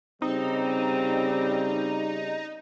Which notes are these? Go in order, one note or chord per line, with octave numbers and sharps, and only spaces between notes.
C#3 G3 C4 D#4